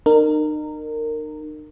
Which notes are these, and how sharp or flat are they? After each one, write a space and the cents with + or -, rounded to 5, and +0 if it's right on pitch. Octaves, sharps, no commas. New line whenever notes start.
D#4 -40 A#4 -20